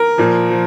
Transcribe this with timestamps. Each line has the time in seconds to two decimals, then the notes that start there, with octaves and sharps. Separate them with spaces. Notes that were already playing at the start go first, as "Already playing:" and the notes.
Already playing: A#4
0.18 A#2 F3
0.50 F3